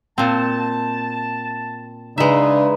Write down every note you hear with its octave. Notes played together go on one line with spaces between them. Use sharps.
A#2 C4 A5
C#3 G#3 D4 D#4 B4 E5